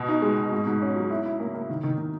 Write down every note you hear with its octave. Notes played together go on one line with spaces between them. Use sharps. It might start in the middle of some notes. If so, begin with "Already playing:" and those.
Already playing: B2
D#4
G#3
B2
G#2
G#2
C#4
F#3
E4
E4
A#3
A#3
D#3
D#3
D#3